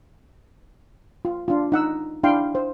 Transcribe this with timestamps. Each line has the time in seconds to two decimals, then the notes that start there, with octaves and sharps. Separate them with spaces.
1.25 F4
1.48 D4 F4
1.72 D#4 F#5 E6
2.23 D4 E4 F5 G5 C6
2.55 C5